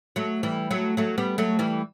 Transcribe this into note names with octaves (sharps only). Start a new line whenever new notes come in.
F#3 A3
E3 G3
F#3 A3
F#3 A3
G3 B3
F#3 A3
E3 G3